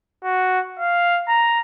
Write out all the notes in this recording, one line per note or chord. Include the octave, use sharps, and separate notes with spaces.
F#4
F5
A#5